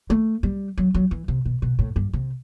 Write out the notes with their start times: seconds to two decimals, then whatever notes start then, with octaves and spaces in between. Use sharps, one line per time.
0.10 A3
0.43 G3
0.78 F#3
0.94 F#3
1.11 E3
1.28 C3
1.45 B2
1.62 B2
1.79 A2
1.96 G2
2.13 C3